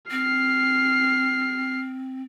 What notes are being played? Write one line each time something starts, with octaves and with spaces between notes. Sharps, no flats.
C4 F6 C7